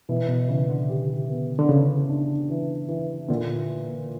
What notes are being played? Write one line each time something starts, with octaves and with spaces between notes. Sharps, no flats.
B2 E3
B2
C#3 E3
D3
G4
B3
D3
C#3 B3
D4
E3
E3
A#2 D3